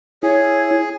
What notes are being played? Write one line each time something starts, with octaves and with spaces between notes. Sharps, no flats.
E4 G#4 C#5